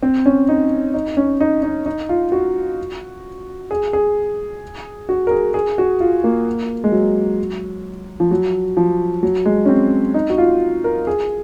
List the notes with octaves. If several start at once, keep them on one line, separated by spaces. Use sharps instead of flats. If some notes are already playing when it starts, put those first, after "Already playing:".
C4
C#4
D#4
D#4
C#4
D#4
D#4
D#4
F4
F#4
G#4
G#4
F#4
A#4
G#4
G#4
F#4
F4
A#3
G#3
F#3
F3
F#3
F3
F#3
G#3
C#4
C4
D#4
F#4
F4
A#4
G#4